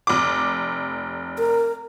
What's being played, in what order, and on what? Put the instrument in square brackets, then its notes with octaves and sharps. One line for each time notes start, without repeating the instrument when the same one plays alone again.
[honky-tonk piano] F1 D6
[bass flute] A#4